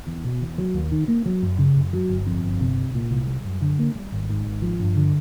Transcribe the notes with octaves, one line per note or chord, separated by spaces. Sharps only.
E2
B2
E2
F#3
D#2
D#3
A#3
F#3
F#2
C#3
F#2
F#3
G1
F2
G1
C3
C2
A#2
C2
G3
F#2
D3
A#3
G3
G#1
G#2
G#1
F3
G2
D3